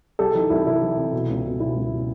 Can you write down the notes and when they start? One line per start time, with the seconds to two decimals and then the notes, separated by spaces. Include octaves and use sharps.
0.19 C2 G4 A4
0.34 E3 D#4
0.50 C2 E4
0.66 C3 E4
0.82 E3
0.97 C3
1.13 B2
1.29 C#2
1.44 B2
1.60 B2 E4
1.76 C#2
1.91 B2